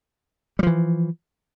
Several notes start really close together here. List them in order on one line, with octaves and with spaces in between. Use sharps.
G3 F3 E3